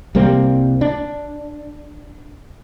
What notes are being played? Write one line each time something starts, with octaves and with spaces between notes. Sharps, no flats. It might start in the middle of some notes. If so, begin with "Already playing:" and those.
C2 G3 A#3 C4
D4